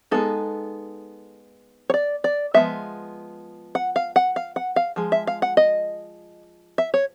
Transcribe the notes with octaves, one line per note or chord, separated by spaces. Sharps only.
G#3 B3 D#4 A4
C#5
D5
D5
F3 G#3 B3 E5
F#5
F5
F#5
F5
F#5
F5
F3 G#3
E5
F5
F#5
D#5
E5
C#5